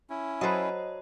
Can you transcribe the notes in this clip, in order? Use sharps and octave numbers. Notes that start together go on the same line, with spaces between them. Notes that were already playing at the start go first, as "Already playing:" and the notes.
C#4 E4
F#3 A4 B4 C5 D#5